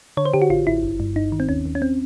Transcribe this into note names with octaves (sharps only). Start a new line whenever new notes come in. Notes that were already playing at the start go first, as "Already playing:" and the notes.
D3 C#5
C5
D3 G4
F#4
A1 F4
A1 E4
G1
G2
G1 D#4
D#3
C4
D#2 C#4
D#2
C#4
C4